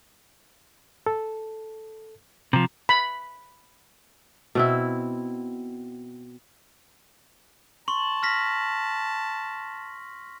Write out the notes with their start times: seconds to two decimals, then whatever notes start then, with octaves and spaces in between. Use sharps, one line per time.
1.06 A4
2.53 C3 F3 A#5
2.89 B5
4.55 B2 C4 E4
7.88 A5 C6 C#6 F#7
8.23 F6 A#6 B6